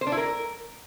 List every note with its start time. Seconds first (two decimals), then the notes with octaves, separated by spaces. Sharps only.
0.01 C5
0.07 D4
0.12 E4
0.17 A#4